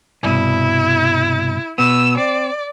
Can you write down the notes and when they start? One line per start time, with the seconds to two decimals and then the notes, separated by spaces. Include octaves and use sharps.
0.23 C2 G2 B2 E4
1.78 B2 B3 E6
2.17 C4 D5